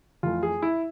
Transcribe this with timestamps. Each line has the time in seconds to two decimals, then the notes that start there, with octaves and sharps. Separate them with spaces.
0.23 F2 E3 A3 F4
0.43 G#4
0.62 E4